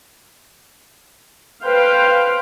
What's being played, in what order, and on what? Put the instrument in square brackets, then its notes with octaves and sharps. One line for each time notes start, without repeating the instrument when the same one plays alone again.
[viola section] B4 C5 F5 G5